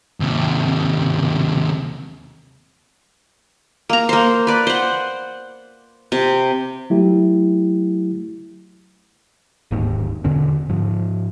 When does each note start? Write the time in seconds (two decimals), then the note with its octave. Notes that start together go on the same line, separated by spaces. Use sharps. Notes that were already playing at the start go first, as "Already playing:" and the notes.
0.20 D#2 C3
3.89 A#3 A#5
4.09 A#3 C5
4.47 B4 D5
4.67 C5 F#5
6.12 C3
6.90 F#3 A3 E4 G4
9.71 D1 D#2 G#2
10.24 E2 B2 D3 C#4
10.69 G#2 F3